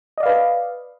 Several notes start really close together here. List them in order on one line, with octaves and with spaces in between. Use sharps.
D#5 D5 F5 B4